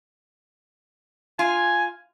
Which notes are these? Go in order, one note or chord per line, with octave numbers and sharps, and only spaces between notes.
F4 G#5